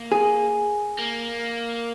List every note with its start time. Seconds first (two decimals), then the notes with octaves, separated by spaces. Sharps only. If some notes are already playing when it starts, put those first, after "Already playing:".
Already playing: A#3
0.12 G#4
0.99 A#3